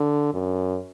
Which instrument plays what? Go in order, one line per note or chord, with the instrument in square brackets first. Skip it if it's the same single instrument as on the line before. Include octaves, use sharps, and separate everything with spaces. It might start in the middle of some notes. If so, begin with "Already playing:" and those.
Already playing: [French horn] D3
F#2